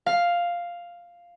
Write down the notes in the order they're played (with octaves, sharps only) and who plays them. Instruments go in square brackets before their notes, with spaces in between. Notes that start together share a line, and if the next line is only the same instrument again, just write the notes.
[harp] F5